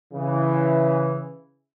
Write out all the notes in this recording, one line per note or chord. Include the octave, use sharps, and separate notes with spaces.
C#3 E3